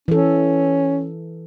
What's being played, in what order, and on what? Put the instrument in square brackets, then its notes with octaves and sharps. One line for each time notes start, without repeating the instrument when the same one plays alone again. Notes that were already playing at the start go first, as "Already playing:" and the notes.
[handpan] E3 A4 [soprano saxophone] C#4